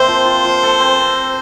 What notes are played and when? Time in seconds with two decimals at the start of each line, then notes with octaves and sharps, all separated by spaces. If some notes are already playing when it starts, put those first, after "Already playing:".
Already playing: C3 A#3 C4 C5
0.08 F3
0.25 F4
0.45 F3
0.63 A4
0.80 C4